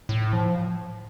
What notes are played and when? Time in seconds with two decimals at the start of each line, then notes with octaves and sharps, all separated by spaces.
0.09 A2
0.33 F3